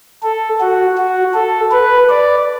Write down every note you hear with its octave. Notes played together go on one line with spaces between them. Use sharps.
A4
F#4
F#4
A4
B4
D5